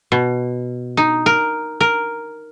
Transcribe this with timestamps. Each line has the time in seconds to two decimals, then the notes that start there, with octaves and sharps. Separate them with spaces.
0.12 B2
0.97 D#4
1.26 A#4
1.81 A#4